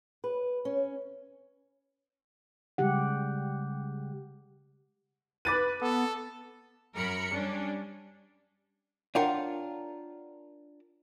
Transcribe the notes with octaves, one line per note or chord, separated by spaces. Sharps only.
B4
C#4
C#3 G3 G#3 G4 F#5
B4 D6 A6 D#7
B3 A4
F#2 A#4 B5 C#7
G3 C#4 D4
D4 F4 A#4 C#5 F#5 G5